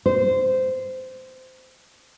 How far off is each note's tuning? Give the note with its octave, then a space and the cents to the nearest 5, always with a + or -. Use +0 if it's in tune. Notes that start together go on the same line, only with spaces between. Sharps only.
C5 -15